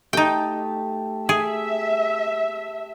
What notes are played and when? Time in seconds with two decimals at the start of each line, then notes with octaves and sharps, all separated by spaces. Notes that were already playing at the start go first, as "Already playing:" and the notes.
0.13 A3 D#4 G4 G5 A5
1.29 G#4 E5